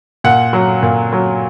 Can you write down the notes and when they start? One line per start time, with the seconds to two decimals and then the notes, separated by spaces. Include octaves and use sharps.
0.24 A#2 F#5
0.53 F#3
0.83 A#2
1.13 F#3